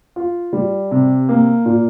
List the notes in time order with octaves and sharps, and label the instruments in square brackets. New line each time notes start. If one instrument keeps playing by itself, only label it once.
[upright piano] F4
G3
C3
A#3
A#2